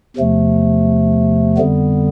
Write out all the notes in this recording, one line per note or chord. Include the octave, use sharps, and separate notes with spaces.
E2 C3 F3 A3
F2 D3 G3 B3